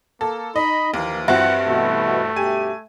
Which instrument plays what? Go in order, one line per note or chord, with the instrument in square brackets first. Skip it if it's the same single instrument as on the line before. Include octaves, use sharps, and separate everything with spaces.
[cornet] A#3 [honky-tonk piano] A4
[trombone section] D#4 [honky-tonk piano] D#5 [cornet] B5
[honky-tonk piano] D#2 [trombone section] E3 F3 [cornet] A#3
[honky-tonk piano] G2 C4 F#4 [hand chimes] E5 [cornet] F#5
[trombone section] B2 E3 [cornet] A3
[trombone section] G2 B2 G4 [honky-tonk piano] G#5